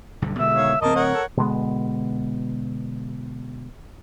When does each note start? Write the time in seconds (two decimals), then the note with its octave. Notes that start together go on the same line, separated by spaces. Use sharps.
0.22 B1 G2 D3
0.39 B2 D3 G#3 E5
0.54 D#3 C#5 F5
0.82 D1 A#3 C4 A#4 D#5 A5
0.95 A#4 C#5 F#5
1.14 A4
1.37 B2 D3 G#3 B3